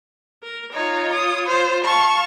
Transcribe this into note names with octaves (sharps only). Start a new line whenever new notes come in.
A#4
D#4 F4 C#5
D#6
F4 C5
F5 A5 C#6